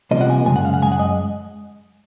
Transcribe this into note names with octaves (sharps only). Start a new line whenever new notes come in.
C2 C3 F3 A#3 D#5
F#5
G#5
F#2 C#3 G#3 G#5
F#5
F5
F#5
F#2 C#3 G#3 G#5
F#5
D#5